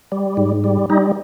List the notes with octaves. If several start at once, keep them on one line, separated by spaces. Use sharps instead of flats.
G3
G#2
G3
G3 D#4